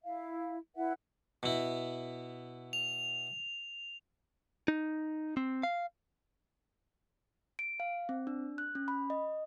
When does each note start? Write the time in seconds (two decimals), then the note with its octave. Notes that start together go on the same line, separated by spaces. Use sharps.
0.04 E4 E5 F5
0.76 E4 B4 E5 F#5
1.43 B2 E4
2.73 F7
4.68 D#4
5.37 C4
5.63 F5
7.59 D7
7.80 F5
8.09 C4
8.27 D4
8.58 F#6
8.75 C#4
8.88 B5
9.10 D#5